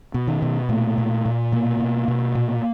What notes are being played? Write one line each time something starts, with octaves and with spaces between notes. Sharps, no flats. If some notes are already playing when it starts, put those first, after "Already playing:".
B2
D#3
B2
A#2 A3
A#2
A#2
B2 A#3
B2
B2
A#2